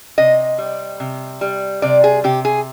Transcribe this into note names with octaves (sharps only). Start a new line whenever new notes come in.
C3 D#5
G3
C3
G3
C3 D5
G#4
C3 G4
G#4